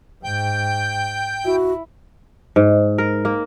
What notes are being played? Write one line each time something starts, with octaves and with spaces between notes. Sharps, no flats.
G#2 G5 G6
E4 F#4
G#2
A#4
A#3